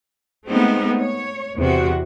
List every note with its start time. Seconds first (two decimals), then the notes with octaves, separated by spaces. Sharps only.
0.47 G#3 A3 B3 C4 D#4
0.99 C#5
1.57 E2 C3 F#4